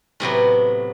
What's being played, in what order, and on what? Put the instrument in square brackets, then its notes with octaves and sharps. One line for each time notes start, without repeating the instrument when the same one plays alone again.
[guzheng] A2 C3 F#3 B3